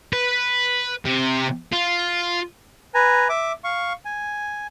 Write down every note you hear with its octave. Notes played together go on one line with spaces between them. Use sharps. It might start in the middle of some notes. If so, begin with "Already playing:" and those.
B4
C3
F4
B4 G#5 A#5
E5 D6
F5 C#6
G#5